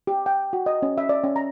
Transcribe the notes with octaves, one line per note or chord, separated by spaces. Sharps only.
G4
G5
F#4
D#5
C#4
E5
D5
C#4
A#5